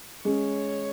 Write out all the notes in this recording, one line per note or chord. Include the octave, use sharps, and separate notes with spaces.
G#3 C#4 C#5